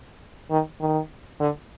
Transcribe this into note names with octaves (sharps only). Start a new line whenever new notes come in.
D#3
D#3
D3